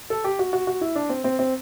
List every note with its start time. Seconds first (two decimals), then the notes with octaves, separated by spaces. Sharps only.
0.10 A4
0.24 G4
0.39 F#4
0.53 F#4
0.67 F#4
0.81 E4
0.96 D4
1.09 C4
1.24 C4
1.39 C4